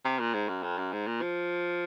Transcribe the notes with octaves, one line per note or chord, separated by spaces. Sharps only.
C3
A#2
G#2
F#2
F2
F#2
G#2
A#2
F3